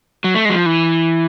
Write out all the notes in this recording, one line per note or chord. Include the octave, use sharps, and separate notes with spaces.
F#3
A3
F#3 G#3
F3
E3